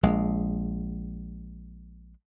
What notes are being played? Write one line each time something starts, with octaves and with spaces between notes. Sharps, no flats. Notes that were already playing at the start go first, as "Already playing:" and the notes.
A#1 G#3